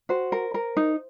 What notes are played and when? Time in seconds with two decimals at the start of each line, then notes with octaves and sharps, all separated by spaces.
0.09 F#4 C5
0.32 A#4
0.54 A#4
0.77 D#4